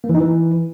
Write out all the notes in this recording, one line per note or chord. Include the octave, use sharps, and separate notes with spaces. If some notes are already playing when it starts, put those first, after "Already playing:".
A#3
E3
D#4
E3